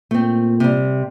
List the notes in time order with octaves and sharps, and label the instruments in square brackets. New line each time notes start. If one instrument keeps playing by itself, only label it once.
[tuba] A#2 [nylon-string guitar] A3 C4
[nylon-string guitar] C3 G3